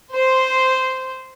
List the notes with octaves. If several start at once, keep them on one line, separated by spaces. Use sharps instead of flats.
C5